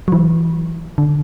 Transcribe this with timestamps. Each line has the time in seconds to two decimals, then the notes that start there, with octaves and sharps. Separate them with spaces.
0.08 F#3
0.12 E3
0.98 D3